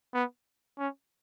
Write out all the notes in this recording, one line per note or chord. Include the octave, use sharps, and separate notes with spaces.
B3
C#4